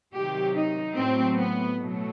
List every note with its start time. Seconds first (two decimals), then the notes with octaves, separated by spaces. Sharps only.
0.14 C3 D#3 F#3 G4
0.54 D#4
0.96 A2 F#3 C4
1.37 B3
1.78 B2 F#3 A3